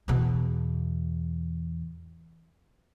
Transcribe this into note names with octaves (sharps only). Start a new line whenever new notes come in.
E2 B2